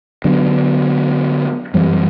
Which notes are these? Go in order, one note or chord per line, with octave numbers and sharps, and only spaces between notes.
D3 F#3 B3 D4
F#2 E3 G3 C4